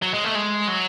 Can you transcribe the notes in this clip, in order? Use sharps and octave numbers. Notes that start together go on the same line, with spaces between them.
F#3
G#3
A3
G#3
F#3